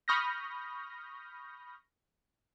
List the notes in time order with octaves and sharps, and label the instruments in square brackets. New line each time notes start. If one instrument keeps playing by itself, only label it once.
[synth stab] B5 C#6 D#6 F6 G6 A#6